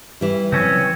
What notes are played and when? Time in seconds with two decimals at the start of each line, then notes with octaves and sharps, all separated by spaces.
0.21 E3 G3
0.52 C#3 F3 F#3 C4 C#4